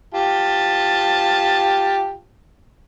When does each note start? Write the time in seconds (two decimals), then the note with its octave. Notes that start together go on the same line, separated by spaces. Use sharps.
0.14 F4 G4 A5